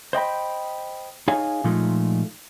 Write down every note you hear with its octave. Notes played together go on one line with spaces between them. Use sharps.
C5 D#5 G5 B5
D#4 G#4 C#5 F5 G#5
A#2 F3 G#3 A3 D#4 F4